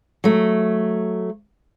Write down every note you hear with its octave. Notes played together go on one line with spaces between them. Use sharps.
F#3 A3